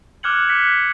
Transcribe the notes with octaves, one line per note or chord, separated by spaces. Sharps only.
D6 F6 F#6 G#6 C#7 F#7
D6 F#6 B6 C#7